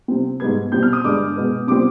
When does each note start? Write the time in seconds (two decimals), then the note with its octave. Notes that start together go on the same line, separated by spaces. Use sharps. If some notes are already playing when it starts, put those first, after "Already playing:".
0.08 C3 G3 C4
0.40 G#2 G3 B3 G#6
0.72 B2 G3 C4 G6
0.83 F6
0.93 D#6
1.04 G2 D3 G#3 B3 D6
1.36 B2 G#3 B3
1.67 C3 G3 C4 D6